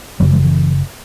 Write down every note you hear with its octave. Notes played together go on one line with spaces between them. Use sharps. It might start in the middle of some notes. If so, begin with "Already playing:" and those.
F#1 F#2 C#3 F#3 A#3
E3 G#3
E3